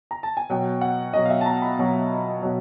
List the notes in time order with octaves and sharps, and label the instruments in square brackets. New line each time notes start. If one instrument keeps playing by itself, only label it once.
[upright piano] A#5
A5
G#5
B2 F#3 G5
F#5
B2 F#3 D#5
F5
E5
A5
A#5
B5
B2 F#3
B2 F#3